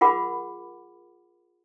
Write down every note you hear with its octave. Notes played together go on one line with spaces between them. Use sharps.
F4 G#4 A#4 F#5 B5 D6